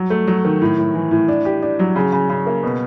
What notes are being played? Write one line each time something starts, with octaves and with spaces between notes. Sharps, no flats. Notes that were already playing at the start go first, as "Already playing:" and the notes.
Already playing: F#3
A3
F#3
D#3
A2
A2
E3
A2
D4
G4
D4
F#3
C#3
C#3
C#3
A#3
B2